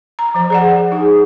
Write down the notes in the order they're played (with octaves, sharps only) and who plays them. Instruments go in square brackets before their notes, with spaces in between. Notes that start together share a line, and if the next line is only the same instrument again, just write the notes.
[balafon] A#5
F3 C5
G#4 D5 F#5
[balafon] D#4 [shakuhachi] G#4